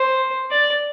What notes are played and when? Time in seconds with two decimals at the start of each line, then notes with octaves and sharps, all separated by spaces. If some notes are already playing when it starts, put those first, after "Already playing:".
Already playing: C5
0.51 D5